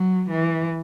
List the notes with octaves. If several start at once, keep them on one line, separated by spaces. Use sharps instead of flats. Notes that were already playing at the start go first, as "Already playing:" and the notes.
Already playing: F#3
E3